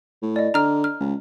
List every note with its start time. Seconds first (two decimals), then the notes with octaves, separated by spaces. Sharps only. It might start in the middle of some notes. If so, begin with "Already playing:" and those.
0.22 A2
0.36 D5 D#5
0.54 D3 A#5 F6
0.84 F6
1.00 C#2